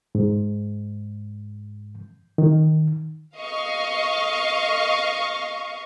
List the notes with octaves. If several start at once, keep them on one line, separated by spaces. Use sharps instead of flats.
G#2
D#3
D#5 F5 C#6